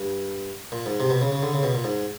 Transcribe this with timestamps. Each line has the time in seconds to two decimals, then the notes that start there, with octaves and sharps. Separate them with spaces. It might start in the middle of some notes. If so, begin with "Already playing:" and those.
Already playing: G2
0.72 A#2
0.86 G#2
1.00 C3
1.10 B2
1.21 C#3
1.32 C#3
1.43 D3
1.53 C#3
1.63 B2
1.75 A#2
1.84 G#2